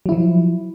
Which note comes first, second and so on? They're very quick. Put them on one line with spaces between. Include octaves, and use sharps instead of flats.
F#3 E4 F3